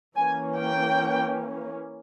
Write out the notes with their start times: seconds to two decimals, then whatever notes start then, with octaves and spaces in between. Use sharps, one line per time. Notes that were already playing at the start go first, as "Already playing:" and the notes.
0.16 E3 A#3 C#4 G#5
0.56 G5